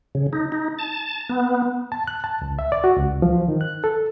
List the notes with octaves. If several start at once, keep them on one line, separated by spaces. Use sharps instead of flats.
C#3
D#4
D#4
A5
B3
A5
F#6
A5
C#2
E5
D5
F#4
C#2
F3
D#3
F#6
A4